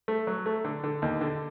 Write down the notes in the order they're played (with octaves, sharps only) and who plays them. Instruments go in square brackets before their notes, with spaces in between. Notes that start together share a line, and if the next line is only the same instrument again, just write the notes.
[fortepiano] A3
F#3
A3
D3
D3
D#2
D3